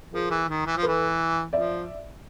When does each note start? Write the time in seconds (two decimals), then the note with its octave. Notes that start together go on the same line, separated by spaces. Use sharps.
0.13 F3 G#4 A#4
0.30 E3
0.49 D#3
0.66 E3
0.76 F3
0.83 E3 A4 B4
1.53 F3 D5 E5